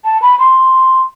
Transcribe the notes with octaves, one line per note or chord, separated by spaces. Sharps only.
A5
B5
C6